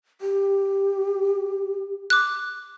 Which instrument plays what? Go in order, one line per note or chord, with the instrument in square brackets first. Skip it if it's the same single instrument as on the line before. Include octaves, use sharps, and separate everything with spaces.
[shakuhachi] G4
[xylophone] D6 F#6